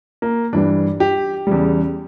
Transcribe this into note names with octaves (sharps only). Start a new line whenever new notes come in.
A#3
G2 E3 G3 D4
G4
E2 C#3 G3